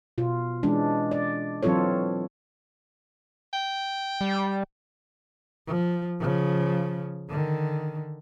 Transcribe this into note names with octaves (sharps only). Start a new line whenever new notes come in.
B2 F4
E3 G#3 C#4 D4
D5
E3 F#3 C4 F4 A4 C#5
G5
G3
F3
C#3 F3
D3 D#3